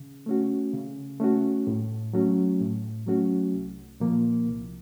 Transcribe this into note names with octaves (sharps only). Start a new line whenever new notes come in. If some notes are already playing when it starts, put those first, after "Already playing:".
Already playing: C#3
A3 C#4 F#4
C#3
A3 C#4 F#4
A2
F#3 A3 C#4 F#4
A2
F#3 A3 C#4 F#4
C2
A#2 F3 A#3
C2